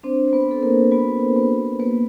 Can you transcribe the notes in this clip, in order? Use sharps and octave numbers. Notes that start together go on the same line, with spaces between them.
C4 D4 C5
C5
B3 B4
B3 A4
A#3 A#4
B3 F#4 B4
B3
A#3 B3 B4